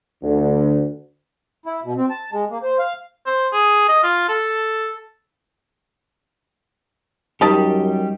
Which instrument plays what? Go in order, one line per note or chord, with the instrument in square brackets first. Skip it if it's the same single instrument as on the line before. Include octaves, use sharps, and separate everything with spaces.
[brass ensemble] D2
[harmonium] E4
B2
C4
A5
G#3
A#3
C5
F5
[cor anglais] C5
G#4
D#5
F4
A4
[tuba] F#2 [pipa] D#3 A5 [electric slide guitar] G3 G4